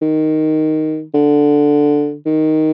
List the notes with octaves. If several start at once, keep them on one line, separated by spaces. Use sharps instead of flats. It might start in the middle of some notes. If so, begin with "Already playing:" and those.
D#3
D3
D#3